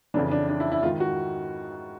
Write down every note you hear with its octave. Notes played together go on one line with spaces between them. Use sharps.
F2 C#3 E3 D4
D4
D4
E4
E4
G#2 D#3 F4
F#4